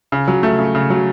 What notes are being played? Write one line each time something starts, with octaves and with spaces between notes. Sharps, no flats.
C#3
F#3
A3
C#3
C#3
F#3